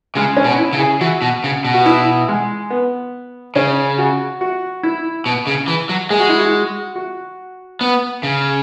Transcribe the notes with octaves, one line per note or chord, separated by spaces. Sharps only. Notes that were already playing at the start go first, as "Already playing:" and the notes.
C#3 G#3
C#4
B2
E4
C#3
G#4
E3 F#4
B2
C#3
B2
F#4
E4
G#3
B3
C#3 C#4
F#4
F#4
E4
B2
C#3
E3
F#3
G#3 G#4
F#4
E4
F#4
F#4
B3
C#3